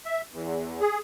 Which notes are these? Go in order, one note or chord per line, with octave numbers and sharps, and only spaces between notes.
E5
E2
G#4